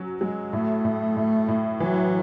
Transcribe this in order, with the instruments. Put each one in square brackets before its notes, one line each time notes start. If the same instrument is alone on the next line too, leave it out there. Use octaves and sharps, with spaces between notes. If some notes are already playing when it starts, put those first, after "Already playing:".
Already playing: [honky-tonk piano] F#3 C#4
[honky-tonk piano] F#3 [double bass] G#3
[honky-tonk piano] A2 [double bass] A3
[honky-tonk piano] A2
A2
A2
[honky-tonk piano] E3 [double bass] F#3